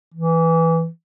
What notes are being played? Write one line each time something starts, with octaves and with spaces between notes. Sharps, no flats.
E3